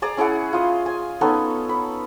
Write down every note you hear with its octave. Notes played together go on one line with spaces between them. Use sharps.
G#4 D5 A#5
C#4 E4 G#4 F#5
F4 D#5
G#5
B3 C#4 D#4 A4
B5